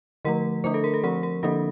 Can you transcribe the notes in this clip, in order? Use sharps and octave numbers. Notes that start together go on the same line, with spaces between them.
D3 F3 A3 A#4
D3 A3 D4 C5
A4
A#4
A4
F3 C4 A#4
A#4
D3 F3 A#3 D4 A4